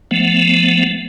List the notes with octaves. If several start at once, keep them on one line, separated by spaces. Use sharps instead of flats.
F3 A3 B3